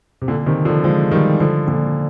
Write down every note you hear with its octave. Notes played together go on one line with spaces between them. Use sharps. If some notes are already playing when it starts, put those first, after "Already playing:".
C3
A#2 D3
C3 D#3
D3 F3
F3 G#3
D#3 G3
D3 F3
A#2 D3